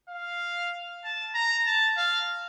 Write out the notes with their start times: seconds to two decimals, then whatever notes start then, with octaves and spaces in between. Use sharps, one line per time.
0.09 F5
1.04 A5
1.35 A#5
1.66 A5
1.97 F5